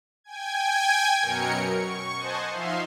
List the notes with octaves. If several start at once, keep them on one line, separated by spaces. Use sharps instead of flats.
G5 G#5 G#6
F#2 B2 F#3 A#4 C#7
C#6
C5 D#5 F#5 G#5 A5
F3 D#4 E5 F5 C6